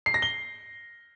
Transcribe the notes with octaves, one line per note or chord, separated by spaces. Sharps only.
C7
A#6
G7